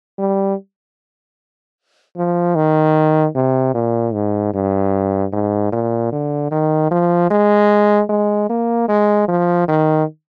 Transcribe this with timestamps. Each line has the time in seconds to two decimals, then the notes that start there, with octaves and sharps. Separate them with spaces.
0.19 G3
2.17 F3
2.56 D#3
3.35 C3
3.75 A#2
4.14 G#2
4.54 G2
5.33 G#2
5.72 A#2
6.12 D3
6.51 D#3
6.91 F3
7.31 G#3
8.09 G#3
8.49 A#3
8.89 G#3
9.28 F3
9.68 D#3